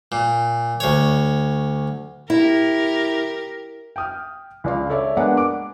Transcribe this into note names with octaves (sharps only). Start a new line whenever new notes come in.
A#2
D2 C#5
E4 G4 A#4
G5 D#6 F6
C#2 D5 F5
A4 C#5 D5 E5
G#3 A#3 B3 D4 F#5
D6